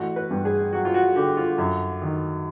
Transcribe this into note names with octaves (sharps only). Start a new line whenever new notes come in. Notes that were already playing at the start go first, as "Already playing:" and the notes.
Already playing: A1 F#4
B4
G2
G#4
F#3 F#4
F4
F#4
D3 G4
F4
F#2
D#3